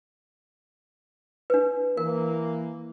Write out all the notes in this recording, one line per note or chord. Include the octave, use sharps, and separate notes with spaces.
D4 B4
E3 A#3 A#4